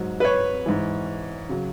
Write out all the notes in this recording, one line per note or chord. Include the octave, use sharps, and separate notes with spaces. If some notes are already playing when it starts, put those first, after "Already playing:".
Already playing: G#2 F#3
B4
C#5
G#2 E3
C#3 F#3